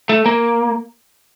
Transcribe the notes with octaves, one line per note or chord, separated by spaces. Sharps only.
A3
A#3